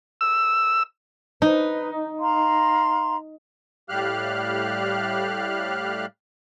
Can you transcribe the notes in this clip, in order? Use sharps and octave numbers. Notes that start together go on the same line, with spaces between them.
E6
D#4 B4
F5 A#5 C6
A2 G3 G4 F5 F6 F#6